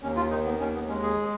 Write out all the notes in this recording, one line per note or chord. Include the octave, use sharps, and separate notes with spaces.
D#2 C#4
F4
D#3 D#4
B3
D#2 C#4
B3
G#3 C#4
G#4